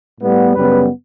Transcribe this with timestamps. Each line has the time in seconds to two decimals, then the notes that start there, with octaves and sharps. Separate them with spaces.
0.21 A2 G3 B3
0.54 F#2 C#3 G3 B3 B4